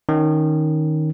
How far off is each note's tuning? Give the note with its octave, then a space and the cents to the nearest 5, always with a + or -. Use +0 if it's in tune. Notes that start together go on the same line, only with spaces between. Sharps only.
D#3 +0 C#4 +0